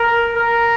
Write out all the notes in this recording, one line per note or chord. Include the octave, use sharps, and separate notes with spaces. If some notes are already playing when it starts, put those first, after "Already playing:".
Already playing: A#4
A#4